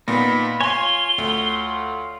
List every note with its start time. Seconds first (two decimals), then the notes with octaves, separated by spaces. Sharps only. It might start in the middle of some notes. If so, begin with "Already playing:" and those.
0.08 A#2 B3 D#4 B5
0.61 F4 C#5 G#5 C6 G7
1.18 D2